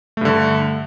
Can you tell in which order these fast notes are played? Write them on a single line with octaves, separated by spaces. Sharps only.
A3 G2 D3